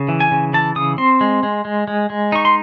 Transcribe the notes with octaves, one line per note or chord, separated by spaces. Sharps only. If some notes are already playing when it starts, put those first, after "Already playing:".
Already playing: C#3
E3
G#5
C#3
E3 A5
C#3 D#6
C4 C6
G#3
G#3
G#3
G#3
G#3
D#4 C#6
C6